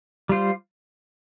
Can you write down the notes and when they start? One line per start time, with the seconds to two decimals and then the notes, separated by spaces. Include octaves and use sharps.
0.29 G3 F4 C5